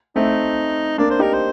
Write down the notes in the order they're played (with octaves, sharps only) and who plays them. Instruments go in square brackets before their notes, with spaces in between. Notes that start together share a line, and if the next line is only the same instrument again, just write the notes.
[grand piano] A3 C4 [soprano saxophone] D#4
[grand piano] A#3 D4 [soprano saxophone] D5
[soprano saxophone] C5
[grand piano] D#4 G4 [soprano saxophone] A#4
[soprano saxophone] C5